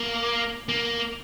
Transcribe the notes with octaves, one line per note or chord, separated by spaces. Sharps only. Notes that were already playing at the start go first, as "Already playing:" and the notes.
Already playing: A#3
A#3